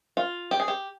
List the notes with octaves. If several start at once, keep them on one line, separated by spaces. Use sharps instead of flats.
F4
G4
G#4
G4